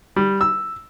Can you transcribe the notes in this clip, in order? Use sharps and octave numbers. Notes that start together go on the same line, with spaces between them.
G3
E6